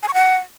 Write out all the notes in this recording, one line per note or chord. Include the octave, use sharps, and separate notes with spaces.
G#5
C#6
F#5